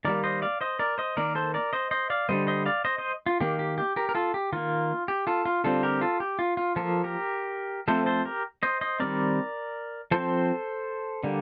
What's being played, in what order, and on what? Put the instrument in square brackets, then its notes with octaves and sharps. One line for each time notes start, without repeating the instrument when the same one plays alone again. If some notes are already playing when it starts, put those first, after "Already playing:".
[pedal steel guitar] D#3 G3 A#3 A#4 D5
C5 D#5
D5 F5
C5 D#5
A#4 D5
C5 D#5
D#3 A#3 A#4 D5
A4 C5
A#4 D5
C5 D#5
C5 D#5
D5 F5
D3 G3 A#3 C5 D#5
C5 D#5
D5 F5
C5 D#5
C5 D#5
F4
D#3 A#3 G4
G4
G4
G4 A#4
A#4
F4 A4
G4
D#3 A#3 F4
G4
F4 A4
F4
D3 G3 C4 F4 A4
G4 A#4
F4 A4
G4
F4
F4
F3 A#3 F4 A4
G4 A#4
F3 A3 C4 A4 C5
A4 C5
G4 A#4
C5 D#5
C5 D#5
D#3 G3 C4 A#4 D5
F3 C4 A4 C5
D3 G3 A#3